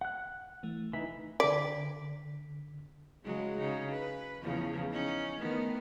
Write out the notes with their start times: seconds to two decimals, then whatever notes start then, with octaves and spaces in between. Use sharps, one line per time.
0.01 F#5 F#6
0.63 E3 A3
0.93 E3 D#4 B6
1.40 D3 D5 B6
3.24 C#3 F#3 G#3
3.58 C#3 D#4
3.90 B4
4.41 E2 C#3 F3
4.90 C#4 D#4
5.39 D#3 A3 B3